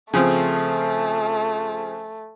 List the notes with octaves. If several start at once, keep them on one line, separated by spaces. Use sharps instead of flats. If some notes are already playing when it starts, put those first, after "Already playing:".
C#3 F3 A3 C4